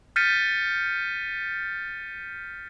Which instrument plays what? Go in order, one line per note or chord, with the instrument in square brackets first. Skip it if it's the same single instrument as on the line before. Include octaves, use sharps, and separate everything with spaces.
[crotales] F6 G6 A6 B6 C#7 D#7